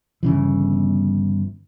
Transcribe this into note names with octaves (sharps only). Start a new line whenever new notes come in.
G1 C#3 E3